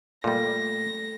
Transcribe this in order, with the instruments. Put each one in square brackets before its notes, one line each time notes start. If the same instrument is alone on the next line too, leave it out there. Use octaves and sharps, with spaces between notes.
[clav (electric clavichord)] A#2 G3 [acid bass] A3 [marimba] A4 [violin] A#6